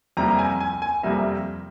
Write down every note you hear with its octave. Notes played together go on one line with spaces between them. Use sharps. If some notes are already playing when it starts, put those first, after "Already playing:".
F2 C3 G3 A#3 A#5
G#5
G#5
G#5
F2 C3 G3 A#3 E5